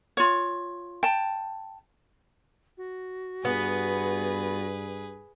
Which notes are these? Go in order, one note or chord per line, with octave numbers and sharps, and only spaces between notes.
F4 C#5
G5 A5
F#4
G2 B3 G#4 B4